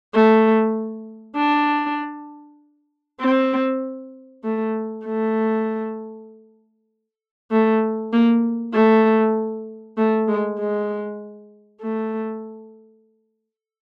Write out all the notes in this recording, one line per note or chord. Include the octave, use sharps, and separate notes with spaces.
A3
D4
C4
A3
A3
A3
A#3
A3
A3
G#3
G#3
A3